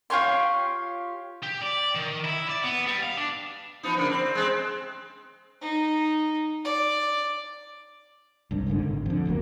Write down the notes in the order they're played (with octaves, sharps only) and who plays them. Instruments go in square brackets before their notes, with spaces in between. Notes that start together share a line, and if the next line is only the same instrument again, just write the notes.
[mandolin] F4 G4 C#5 C6
[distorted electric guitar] G4
D5
D#3
E4
D5
B3
G3
F5
D4
[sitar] F3 B3 D#4
C#3 A#3 D4
C4
G#3 C4
[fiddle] D#4
D5
[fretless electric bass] C2 G2
F#1 C2 G#2 D3
G#1
F2 D3
G1 D2 F#3 A#3